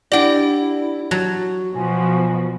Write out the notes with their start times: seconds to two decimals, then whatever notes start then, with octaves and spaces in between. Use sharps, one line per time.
0.12 D4 E4 G4 D5 F#5
1.11 F#3 F#4 A5
1.75 B2 F3 F#4 G#5